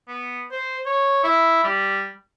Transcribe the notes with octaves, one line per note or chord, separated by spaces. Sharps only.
B3
C5
C#5
E4
G3